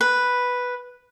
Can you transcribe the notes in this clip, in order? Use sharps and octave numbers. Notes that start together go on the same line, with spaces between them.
B4